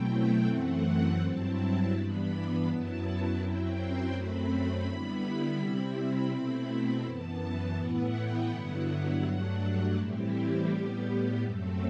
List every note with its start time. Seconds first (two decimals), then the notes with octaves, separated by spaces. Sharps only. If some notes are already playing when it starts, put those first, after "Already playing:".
Already playing: B2 F#3 A3 C4 E4 G5
0.46 F#2 E3 A3 C4 F#5
1.19 G2 F#3 C4 E4 A5
1.92 G2 E3 B3 D4 B5
2.66 F#2 F#3 B3 E4 A5
3.39 F#2 F#3 C4 E4 G5
3.75 C6
4.11 F#2 F#3 A3 C4 B5
4.84 D3 G3 B3 E4
5.57 C3 G3 C4 E4 B5
6.30 B2 A3 C4 E4
7.03 F#2 E3 B3 A5
7.76 A2 E3 B3 E4 F#5
8.13 G5
8.49 G2 D3 F#3 B3 E4 F#5
9.22 G2 F#3 A3 D4
9.95 A2 E3 G3 C4 E4 G4
10.68 A2 G3 B3
11.41 F#2 F#3 A3 C4 A4